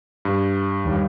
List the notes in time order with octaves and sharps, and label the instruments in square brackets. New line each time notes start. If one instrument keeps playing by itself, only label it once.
[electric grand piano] G2
[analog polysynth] D#2 G3